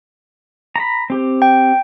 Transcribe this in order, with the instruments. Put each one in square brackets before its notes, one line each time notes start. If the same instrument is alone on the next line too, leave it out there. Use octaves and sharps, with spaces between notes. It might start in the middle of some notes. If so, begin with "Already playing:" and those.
[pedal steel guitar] A#5 B5
C4 G4
[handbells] G5